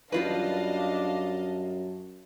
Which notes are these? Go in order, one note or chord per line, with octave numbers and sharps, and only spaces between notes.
F#2 G3 D4 F4 B4 D#5 F5 A5